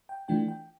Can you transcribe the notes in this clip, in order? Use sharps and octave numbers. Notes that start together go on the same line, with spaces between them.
G5
E3 A3 D4 F4 G5
G5